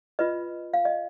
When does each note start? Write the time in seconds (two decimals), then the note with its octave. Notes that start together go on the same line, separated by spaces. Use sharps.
0.19 F4 B4 D#5
0.74 F5
0.85 D#5